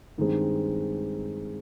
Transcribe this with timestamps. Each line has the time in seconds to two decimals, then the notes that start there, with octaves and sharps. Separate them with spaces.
0.18 G2 D#3 G#3 C4